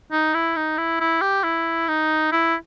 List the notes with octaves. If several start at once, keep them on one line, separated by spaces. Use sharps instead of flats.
D#4
E4
D#4
E4
E4
G4
E4
D#4
E4